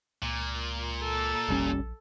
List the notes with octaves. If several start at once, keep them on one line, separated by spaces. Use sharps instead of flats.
C#2 A#2
A4
F1 A#1 G3 C#4